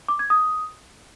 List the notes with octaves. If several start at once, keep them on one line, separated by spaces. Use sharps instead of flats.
D6
G#6
D#6